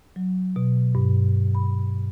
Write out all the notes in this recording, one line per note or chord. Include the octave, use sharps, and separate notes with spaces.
F#3
B2
G2
B5